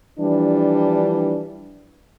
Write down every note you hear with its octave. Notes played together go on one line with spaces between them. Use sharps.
E3 F3 G3 D4